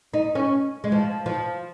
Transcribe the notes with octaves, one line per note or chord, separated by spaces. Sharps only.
D#4
C#4
G#3
F3
F3